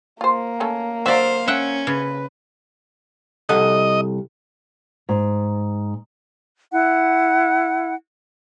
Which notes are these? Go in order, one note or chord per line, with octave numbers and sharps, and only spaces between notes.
A#3 F4 C5
A3 C#4 A4
D3 F#3 C5 D5 E5 F5
C#4 E5 F#5 G5
C#3 B4
C2 A4 D#5 F#5
G#2
E4 F#5